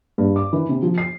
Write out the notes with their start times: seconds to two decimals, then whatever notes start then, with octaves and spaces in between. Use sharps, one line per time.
0.18 G2
0.36 D6
0.53 E3
0.69 C3
0.82 F3
0.98 C7